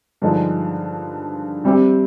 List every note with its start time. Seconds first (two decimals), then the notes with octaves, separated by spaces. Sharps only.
0.22 G2 D3 F3 G#3 D#4
1.64 C3 G3 C4 G4